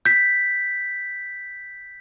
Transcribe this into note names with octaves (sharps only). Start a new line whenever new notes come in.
G6 B6